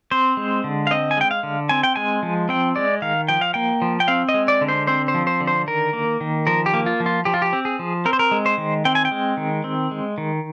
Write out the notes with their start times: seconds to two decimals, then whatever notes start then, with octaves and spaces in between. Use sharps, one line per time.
0.11 C4 C5
0.37 G#3
0.64 D3
0.87 F5
0.91 C4 D#5
1.11 G#5
1.17 G#3 G5
1.31 F5
1.43 D3
1.69 C4 G#5
1.83 G5
1.96 G#3 G#5
2.23 F3
2.49 C4 G5
2.76 G#3 D5
3.02 D#3 F5
3.28 F3 G5
3.41 F5
3.54 A#3 G5
3.82 F3
4.00 G5
4.08 C4 F5
4.29 D#5
4.34 G#3
4.48 D5
4.61 D3
4.68 C5
4.87 C4 C5
5.08 C5
5.14 F3
5.27 C5
5.41 D3
5.47 C5
5.67 D#3 A#4
5.93 A#3
6.21 D#3
6.47 F3 A#4
6.66 G4
6.74 A#3
6.86 F4
7.00 F3
7.06 F4
7.25 F3 G4
7.34 F4
7.42 G4
7.53 C4
7.65 G#4
7.79 F3
8.05 C4 A#4
8.13 C5
8.19 A#4
8.31 G#3
8.46 C5
8.58 D#3
8.85 C4 G5
8.95 G#5
9.05 G5
9.11 G#3
9.37 D#3
9.64 C4
9.91 G#3
10.18 D#3